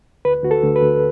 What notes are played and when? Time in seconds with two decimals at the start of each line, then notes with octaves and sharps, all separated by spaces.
0.25 D2 B4
0.43 D2 F#4
0.51 A4
0.63 D2
0.76 B4
0.82 D2